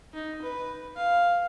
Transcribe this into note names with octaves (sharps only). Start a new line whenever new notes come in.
D#4
B4
F5